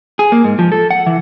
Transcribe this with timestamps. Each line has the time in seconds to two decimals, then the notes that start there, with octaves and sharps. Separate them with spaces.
0.19 G#4
0.32 A#3
0.44 G#2
0.59 F3
0.72 A4
0.91 F#5
1.06 E3